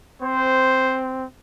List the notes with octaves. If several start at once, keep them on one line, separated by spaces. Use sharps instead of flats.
C4 C5